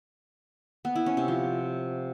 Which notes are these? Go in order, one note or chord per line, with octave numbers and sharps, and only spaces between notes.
B3
E4
C#4
C3
F3